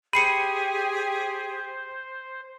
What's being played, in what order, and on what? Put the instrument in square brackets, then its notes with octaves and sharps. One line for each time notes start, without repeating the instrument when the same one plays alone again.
[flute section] G4 G#4 [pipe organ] C5 [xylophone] B5 C7 C#7 [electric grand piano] D#7